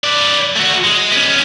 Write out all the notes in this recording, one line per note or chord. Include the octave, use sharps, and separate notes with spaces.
B4 D5
A3 F#4
G#3
B3 C#4